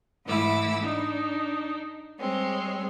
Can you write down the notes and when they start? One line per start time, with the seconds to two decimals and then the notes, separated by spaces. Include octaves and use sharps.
0.25 G#2 E3 A3 E4 D6 E6
0.81 D4 D#4
2.18 G3 G#3 C4 C#5